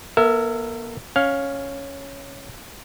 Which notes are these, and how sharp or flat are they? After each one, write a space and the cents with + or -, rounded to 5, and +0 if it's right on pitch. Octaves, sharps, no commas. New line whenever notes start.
A#3 +45 A#4 -45 E5 +0
C#4 +0 F5 +10